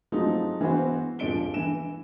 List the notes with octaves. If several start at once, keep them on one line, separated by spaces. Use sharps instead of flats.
F3 F#3 G#3 A3 C4 D#4
E3 G#3 B3 F#4 C5
D#1 F3 G#3 D4 D7 G7
E3 E7